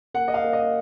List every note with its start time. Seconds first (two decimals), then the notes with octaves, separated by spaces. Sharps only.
0.14 A#3 F#5
0.28 D#5
0.34 F5
0.44 A#3
0.53 D#5